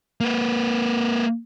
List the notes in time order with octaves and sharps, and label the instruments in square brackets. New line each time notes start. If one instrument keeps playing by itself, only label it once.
[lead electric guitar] A#3 B4